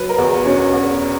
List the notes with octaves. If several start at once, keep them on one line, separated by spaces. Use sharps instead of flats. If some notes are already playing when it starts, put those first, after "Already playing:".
Already playing: F#3 B4
A#4
E2
B2 C#4
E2